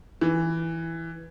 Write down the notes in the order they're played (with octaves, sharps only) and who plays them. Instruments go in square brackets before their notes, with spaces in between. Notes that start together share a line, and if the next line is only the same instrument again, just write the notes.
[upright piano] E3